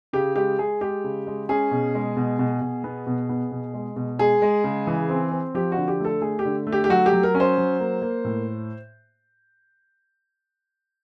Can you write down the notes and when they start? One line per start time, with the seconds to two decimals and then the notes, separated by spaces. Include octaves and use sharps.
0.13 C#3 G4
0.36 G#3 G4
0.59 G#3 G#4
0.81 G#3 G4
1.04 C#3
1.27 G#3
1.49 C#4 G#4
1.71 B2
1.94 G#3
2.16 B2
2.39 B2
2.61 B2
2.84 B3
3.07 B2
3.29 B3
3.52 B2
3.74 G#3
3.96 B2
4.19 G#3 G#4
4.42 G#3
4.64 C#3
4.87 E3
5.09 C4
5.32 C4
5.54 F3 G4
5.72 D3 F#4
5.88 G4
6.00 A3 A4
6.21 A3 G#4
6.39 G4
6.45 D3
6.67 A3
6.72 G4
6.84 G4
6.89 F#3 F#4
7.06 G4
7.13 F#3
7.23 A#4
7.35 C#4
7.40 C5
7.58 F#3
7.80 A#3
8.02 A#3
8.25 A2